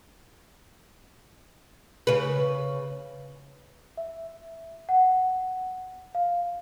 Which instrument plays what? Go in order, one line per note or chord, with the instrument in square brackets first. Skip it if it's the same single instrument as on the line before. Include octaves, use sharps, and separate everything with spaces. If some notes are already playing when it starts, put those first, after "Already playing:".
[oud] C#3 B4
[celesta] E5
F#5
F5